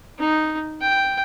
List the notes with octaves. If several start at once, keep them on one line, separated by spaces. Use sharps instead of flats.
D#4
G5